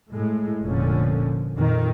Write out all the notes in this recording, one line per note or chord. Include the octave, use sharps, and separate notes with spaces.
A2 G#3
F1 A#2 D3 F3 C#4
F2 A#2 D#3